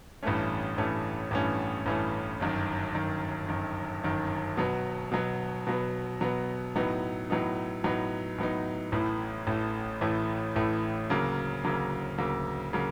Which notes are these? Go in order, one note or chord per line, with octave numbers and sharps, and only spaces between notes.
A1 G2 E3 A3 C#4
A1 G2 E3 A3 C#4
A1 G2 E3 A3 C#4
A1 G2 E3 A3 C#4
G1 F#2 D#3
G1 F#2 D#3
G1 F#2 D#3
G1 F#2 D#3
B2 F#3 B3
B2 F#3 B3
B2 F#3 B3
B2 F#3 B3
A2 F#3 B3 D#4
A2 F#3 B3 D#4
A2 F#3 B3 D#4
A2 F#3 B3 D#4
A1 A2 E3 A3
A1 A2 E3 A3
A1 A2 E3 A3
A1 A2 E3 A3
D2 C#3 F#3 A#3
D2 C#3 F#3 A#3
D2 C#3 F#3 A#3
C#3 F#3 A#3